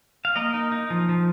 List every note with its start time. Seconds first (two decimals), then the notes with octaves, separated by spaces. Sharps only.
0.25 F5
0.36 A#3 A#4 D#5
0.54 D#4
0.72 D#4
0.90 F3
1.09 F3